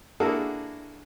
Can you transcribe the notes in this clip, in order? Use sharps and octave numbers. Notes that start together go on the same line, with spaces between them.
A#3 D4 E4 F#4 G#4 A4